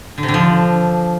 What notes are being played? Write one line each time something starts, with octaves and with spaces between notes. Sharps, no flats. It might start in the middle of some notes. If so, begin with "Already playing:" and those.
D3
C3
D3
F3